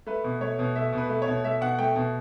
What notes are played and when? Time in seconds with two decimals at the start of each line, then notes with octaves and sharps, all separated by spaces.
0.06 A3 B4
0.24 B2
0.40 A3 C#5
0.59 B2
0.76 A3 E5
0.93 B2
0.98 B4
1.09 A3
1.22 C#5
1.27 B2
1.44 A3 E5
1.61 B2 F#5
1.79 A3 G5
1.95 B2